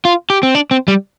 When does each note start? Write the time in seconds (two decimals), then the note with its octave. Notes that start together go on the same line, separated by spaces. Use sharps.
0.05 F4
0.30 G4
0.43 C4
0.55 D4
0.71 C4
0.88 G3